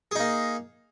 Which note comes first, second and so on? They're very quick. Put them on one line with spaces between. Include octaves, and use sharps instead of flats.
G#4 D#4 A#3